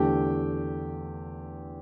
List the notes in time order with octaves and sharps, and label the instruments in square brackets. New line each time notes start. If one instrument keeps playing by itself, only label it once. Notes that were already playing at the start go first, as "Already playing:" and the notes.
Already playing: [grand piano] E2 D3 A3 G4 G5